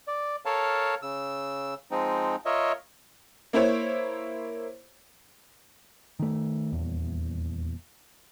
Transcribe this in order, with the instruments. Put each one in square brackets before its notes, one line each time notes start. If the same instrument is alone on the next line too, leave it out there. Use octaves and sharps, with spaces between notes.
[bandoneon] D5
A4 A#4 C#5 F5 A5
C#3 E6
F3 G#3 C4 D#4
F4 A#4 C#5 D#5 E5
[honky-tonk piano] A#3 E4 C5 C#5
[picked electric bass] D#3 A3
D#1 E2